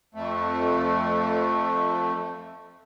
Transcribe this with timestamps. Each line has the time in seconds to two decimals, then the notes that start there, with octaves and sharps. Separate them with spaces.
0.15 F2 A3